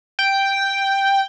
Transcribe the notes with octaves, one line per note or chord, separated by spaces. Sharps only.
G5